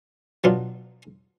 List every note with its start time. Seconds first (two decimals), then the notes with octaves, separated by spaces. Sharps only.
0.44 B2 F#3 B3 D4 F4